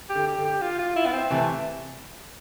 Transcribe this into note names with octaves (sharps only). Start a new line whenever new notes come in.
G4
D3
G4
D3
G4
F4
F4
E4
B3
C4
C3 E3 A3